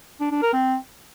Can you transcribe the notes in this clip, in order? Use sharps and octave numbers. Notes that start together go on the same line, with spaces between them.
D4
D4
A#4
C4